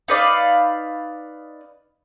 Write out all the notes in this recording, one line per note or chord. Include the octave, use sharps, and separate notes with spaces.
D#4 B4 D5 F5